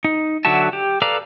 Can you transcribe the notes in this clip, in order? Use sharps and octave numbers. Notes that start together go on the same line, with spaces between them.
D#4
D3 F#3 F#4 E5 A5
G4
A4 B4 D5 F5 A#5